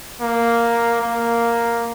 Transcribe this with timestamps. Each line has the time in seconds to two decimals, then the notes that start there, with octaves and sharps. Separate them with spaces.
0.21 A#3
1.01 A#3